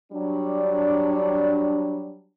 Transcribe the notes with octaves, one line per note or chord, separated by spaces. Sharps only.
F#3 G3 D4